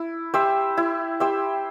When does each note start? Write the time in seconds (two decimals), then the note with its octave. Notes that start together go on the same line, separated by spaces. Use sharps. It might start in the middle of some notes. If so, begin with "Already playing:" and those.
Already playing: E4
0.34 G4 C5 E5
0.77 E4
1.20 G4 C5 E5